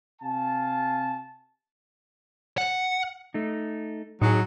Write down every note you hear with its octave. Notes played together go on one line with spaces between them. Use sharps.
C3 F5 G#5 A5
F#5
A3 D#4
A2 F#3 D#4 F#4 G#4